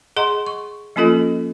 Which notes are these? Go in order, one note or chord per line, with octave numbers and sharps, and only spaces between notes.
G#4 D#5 F#5 A#5 C6
C#6
F3 A#3 C#4 F4 A4 D#5